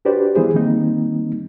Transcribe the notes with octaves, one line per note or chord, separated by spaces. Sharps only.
D4 F#4 G4 B4 C5 D5
E3 G3 B3 E4 G#4 C5
D#3 G3 A#3 C4 D#4